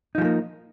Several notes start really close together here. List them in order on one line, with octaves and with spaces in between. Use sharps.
D#4 F3 G#3 A#3